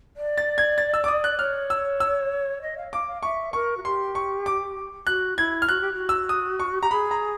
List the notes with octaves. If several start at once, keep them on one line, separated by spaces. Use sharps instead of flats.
D5
A6
G#6
A6
E6
D6
D#6
F#6
C#5 F6
E6
E6
D#5
F5
F5 D6
F5
E5 C#6
A#4 C#6
F#4
G4 C6
C#6
D6
F#4 F#6
E4 G#6
F6
F#4 F#6
G4
F#4
E6
D#6
C#6
G4 A#5
G#4 B5
A#5